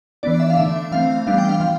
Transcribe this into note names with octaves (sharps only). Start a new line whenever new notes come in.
E3 B3 D4 D5
E5
F5
D3 A3 D4 E5
E3 A3 C4 F5
E3 G3 B3 D4 F5
G5
F5
F3 F5